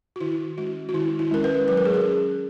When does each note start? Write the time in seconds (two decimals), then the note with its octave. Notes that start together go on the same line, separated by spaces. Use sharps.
0.16 F#4
0.21 D#3 E4
0.58 G#3 C#4 F#4
0.89 F#4
0.94 D#3 E4
1.19 E4
1.31 G#3 C#4 A#4
1.44 B4
1.68 F#3 B4
1.77 A#4
1.85 G#4
1.94 A#4
2.05 C#4